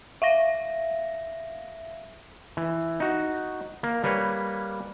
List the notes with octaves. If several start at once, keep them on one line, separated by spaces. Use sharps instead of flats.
E5 F5 A#6
E3
D#4 F#4
A#3
G3 A#3 B4 C#5